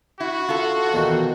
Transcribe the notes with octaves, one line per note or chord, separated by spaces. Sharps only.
E4 F#4
F4 A4
E2 B2 D#3